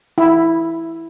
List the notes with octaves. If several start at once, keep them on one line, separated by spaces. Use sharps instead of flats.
E4